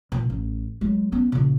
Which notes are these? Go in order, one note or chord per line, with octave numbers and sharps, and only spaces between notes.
A#2
A1
F#3 G#3
B3 C#4
A#2 C#3